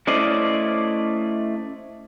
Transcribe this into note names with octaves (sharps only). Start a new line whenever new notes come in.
A3 C#4 E4 C5 D5 D#5